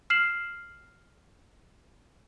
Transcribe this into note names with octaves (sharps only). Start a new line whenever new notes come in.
F6 C7 E7 F#7